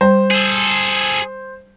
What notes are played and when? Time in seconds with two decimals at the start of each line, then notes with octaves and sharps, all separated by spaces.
0.01 G3 C5
0.31 G#4 A4